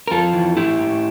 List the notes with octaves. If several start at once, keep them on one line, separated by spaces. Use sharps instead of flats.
A#4
F2 F4 A4
E3
A2 E4 G4
A2